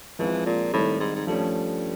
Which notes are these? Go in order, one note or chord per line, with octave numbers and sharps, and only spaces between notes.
E3 F3 G#3 C4 F4
A#2
A2 D#3 G3 C4 D#4
G#2
G#2
G2 F3 A3 C#4